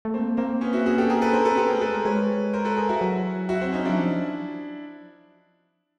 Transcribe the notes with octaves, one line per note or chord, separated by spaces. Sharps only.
A3
A#3 C4
A#3 C4
B3 C#4
E4 F#4
F#4 G#4
G4 A4
G#4 A#4
A4 B4
D4 A#4 C5
C#4
C4 A4 B4
B3 G4 A4
A3 G#4 A#4
A4 B4
G#3 A#4 C5
G#3 B4 C#5
A#4 C5
A4 B4
G#4 A#4
E4 F#4
F#3
E4 F#4
C4
C#4 D#4
F#3 D4 E4
F3